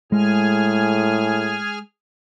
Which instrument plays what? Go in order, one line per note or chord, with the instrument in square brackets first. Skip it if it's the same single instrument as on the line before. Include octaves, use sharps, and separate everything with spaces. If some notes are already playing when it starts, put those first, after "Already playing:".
[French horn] A2 [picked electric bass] G#3 [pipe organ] G#4 G#5 F6